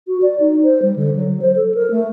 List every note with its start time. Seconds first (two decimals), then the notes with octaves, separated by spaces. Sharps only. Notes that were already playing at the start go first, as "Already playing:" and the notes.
0.07 F#4
0.22 D5
0.40 D#4
0.63 C5
0.82 G3
0.96 D3
1.16 F#3
1.41 C5
1.56 A4
1.75 A#4
1.91 A3